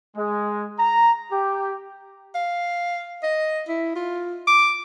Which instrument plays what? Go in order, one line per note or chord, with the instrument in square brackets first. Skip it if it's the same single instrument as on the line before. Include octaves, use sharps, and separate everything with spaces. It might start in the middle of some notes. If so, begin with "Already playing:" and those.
[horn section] G#3
A#5
G4
[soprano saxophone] F5
D#5
E4
F4
D6